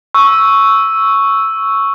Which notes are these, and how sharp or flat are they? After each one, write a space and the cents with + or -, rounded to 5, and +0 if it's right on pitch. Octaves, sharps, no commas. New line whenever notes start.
C#6 +0 E6 +0